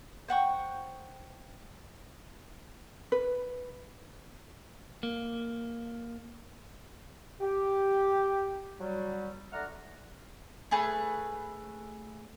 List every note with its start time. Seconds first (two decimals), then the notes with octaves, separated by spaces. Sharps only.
0.28 C5 F#5 G5 C#6
3.12 B4
5.03 A#3
7.41 G4
8.80 F#3 G3
9.52 D3 A3 D5 F#5 A#5 F6
10.71 A3 G#4 B4